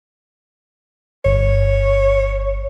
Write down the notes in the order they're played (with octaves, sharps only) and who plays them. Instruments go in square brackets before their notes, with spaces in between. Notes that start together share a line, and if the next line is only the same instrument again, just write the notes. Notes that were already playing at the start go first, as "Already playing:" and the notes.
[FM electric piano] G1 [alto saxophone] C#5